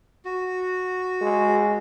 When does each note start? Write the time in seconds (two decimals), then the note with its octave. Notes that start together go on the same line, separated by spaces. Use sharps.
0.25 F#4
1.21 G#3